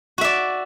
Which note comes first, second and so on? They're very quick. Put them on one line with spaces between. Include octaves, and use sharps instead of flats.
F#4 E5 D5